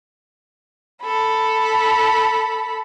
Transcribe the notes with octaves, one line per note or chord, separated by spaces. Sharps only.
A4 B5